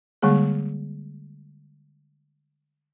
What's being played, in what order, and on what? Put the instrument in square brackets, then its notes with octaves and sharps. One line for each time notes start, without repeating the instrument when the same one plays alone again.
[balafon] D3 G3 G#3 A#3 G#4